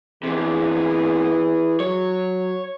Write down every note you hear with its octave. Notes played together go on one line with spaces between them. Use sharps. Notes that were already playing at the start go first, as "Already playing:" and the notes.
E2 C3 E3 G#4
F#3 C#5